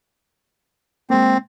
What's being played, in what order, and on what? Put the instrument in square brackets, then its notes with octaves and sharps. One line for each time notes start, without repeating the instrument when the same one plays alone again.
[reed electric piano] G#3 A#3 [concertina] C4